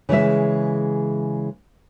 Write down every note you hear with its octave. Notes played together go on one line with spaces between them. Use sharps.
C#3 E3 G#3 E5